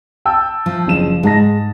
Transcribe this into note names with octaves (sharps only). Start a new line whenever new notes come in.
G5 A5 E6
F3
F#1 C#3 E7
G#2 G#3 A5 A#6